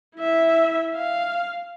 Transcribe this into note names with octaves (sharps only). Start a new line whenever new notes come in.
E4 E5
F5